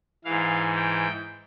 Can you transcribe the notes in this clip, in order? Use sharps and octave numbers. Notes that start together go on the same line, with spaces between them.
G#2 E3 F5
G5